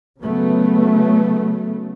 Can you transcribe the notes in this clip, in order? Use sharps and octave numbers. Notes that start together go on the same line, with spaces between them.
C#3 F#3 A3 B3